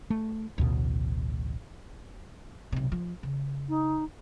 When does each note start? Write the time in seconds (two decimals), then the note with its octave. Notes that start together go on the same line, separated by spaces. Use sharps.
0.10 A3
0.58 A1 D2 B2
2.72 B1 C3
2.92 F3
3.23 C#3
3.69 D#4